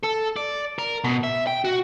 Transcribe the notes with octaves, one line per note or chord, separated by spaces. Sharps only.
A4
D5
A#4
B2
E5
G5
F#4